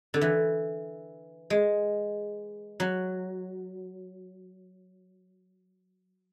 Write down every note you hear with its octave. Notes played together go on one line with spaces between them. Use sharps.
D3
E3
G#3
F#3